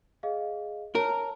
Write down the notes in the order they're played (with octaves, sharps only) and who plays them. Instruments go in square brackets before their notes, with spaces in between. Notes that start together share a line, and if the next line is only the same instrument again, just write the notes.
[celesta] G#4 D#5 F5
[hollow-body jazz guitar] A#4 [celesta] C#5 A5